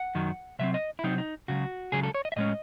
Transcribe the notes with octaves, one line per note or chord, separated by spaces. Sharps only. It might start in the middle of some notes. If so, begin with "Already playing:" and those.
Already playing: F#5
F#2 D#3 F#3
C3 F#3 C4 E5
D#5
E4
C3 F#3 C4 D#4
D#4
C#2 C#3 F#3 F#4
C#2 C#3 F#3 G#4
A4
C#5
D#5
E5
A2 G#3 C#4 D#5